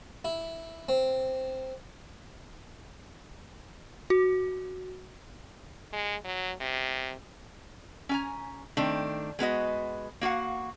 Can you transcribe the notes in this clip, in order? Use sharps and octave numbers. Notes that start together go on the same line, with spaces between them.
E4
C4
F#4
G#3
F#3
C3
C#4 G#5 A#5
D#3 A3 C4 D4
G#3 B3 F#4 D#5
A#3 F#4 F5 F#5